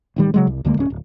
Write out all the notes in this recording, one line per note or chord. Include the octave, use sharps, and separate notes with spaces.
A1 D#3 G3
C#3 F#3 G#3
C2
D2 D3 G#3 A#3
D1 C#4
D1